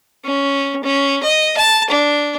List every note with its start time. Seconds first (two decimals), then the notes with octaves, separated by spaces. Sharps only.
0.25 C#4
0.84 C#4
1.23 D#5
1.57 A5
1.90 D4